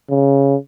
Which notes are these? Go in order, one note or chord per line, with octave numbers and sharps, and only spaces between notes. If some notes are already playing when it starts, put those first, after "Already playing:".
C#3